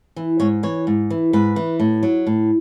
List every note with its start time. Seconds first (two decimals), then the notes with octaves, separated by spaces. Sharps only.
0.16 E3
0.40 G#2 C#5
0.63 E3 C#5
0.87 G#2
1.10 E3
1.33 G#2 B4
1.56 E3
1.79 A2
2.03 F#3
2.27 A2